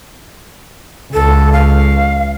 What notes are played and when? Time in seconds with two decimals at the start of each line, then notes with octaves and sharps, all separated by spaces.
1.14 C#2 A4
1.52 F5